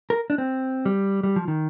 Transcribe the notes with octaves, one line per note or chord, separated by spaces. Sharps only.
A#4
D4
C4
G3
G3
F3
D#3